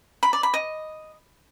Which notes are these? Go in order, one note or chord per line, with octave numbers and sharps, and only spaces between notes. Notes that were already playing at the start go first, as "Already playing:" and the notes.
B5
D5
B5
D#5